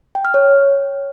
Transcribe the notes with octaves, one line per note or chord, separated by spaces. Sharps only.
G5
F6
C#5